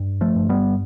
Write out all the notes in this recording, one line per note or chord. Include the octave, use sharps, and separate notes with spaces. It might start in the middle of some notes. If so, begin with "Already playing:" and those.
Already playing: G2
F3 A3
G2
G3 B3